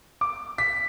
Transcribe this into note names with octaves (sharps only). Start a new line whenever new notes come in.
D6
B6